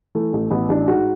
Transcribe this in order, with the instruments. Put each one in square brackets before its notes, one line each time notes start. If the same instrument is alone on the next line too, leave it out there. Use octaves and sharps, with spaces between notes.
[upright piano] E3 A3
A1
A1 B3
A1 D4
G#2 F#4